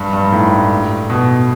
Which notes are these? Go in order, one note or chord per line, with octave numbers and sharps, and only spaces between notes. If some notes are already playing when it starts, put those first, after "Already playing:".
Already playing: G2
G2
G#2
A2
B2